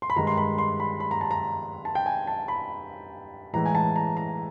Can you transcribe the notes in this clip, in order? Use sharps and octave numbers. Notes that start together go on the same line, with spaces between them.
C6
B5
G2 D#3 G#3 A#5
C6
B5
C6
B5
B5
A#5
A5
A#5
A5
G5
G#5
A5
B5
A2 E3 G#3 A#5
G#5
A5
A#5
A#5